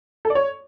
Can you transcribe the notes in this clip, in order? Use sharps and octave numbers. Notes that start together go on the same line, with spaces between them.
A4
D5
C#5